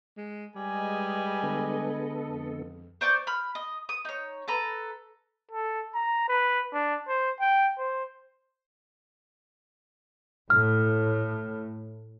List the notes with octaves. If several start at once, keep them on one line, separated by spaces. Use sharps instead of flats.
G#3
G3 G#3 B4 D#5 G#5
D3 B3 A4
F2
C5 D5 C#6 G6
B5 F6
D#5
D#6
D#4 C#5
A4 B4 A#5
A4
A#5
B4
D4
C5
G5
C5
A2 F6